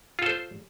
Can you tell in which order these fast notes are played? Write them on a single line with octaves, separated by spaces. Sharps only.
F4 A4 C5